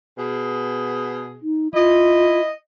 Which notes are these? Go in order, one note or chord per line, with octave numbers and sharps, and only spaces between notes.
B2 G#4
D#4
E4 F4 D#5